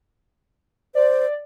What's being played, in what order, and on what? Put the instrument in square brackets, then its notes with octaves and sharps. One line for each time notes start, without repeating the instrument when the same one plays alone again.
[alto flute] C5 [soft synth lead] D5